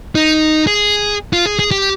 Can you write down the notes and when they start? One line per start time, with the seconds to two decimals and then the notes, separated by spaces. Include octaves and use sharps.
0.15 D#4
0.67 G#4
1.33 F4
1.46 G#4
1.59 G#4
1.71 G4